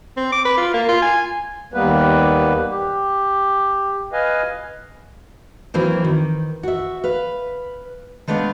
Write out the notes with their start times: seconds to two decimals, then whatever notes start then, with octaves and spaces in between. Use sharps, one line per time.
0.17 C4
0.32 D6
0.45 B4
0.58 F4
0.74 A#3
0.89 F4
1.02 G#5
1.74 D#2 G3 A#3 B3 B4
2.70 G4
4.13 B4 D#5 F5 G#5
5.74 E3 F#3 A#3 C4
6.04 D#3
6.63 F#4 E5
7.04 B4 F5
8.28 G#3 A3 B3 D4 F5